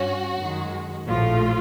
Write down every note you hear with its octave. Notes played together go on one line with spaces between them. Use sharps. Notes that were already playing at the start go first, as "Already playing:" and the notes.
Already playing: G2 C#4 F#4
F#2 D#3 G#3
A#1 A2 F3 A3 F4